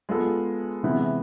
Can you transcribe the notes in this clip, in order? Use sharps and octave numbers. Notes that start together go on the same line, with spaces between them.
G#3 B3 F4 A4
C3 E3 G#3 B3 E4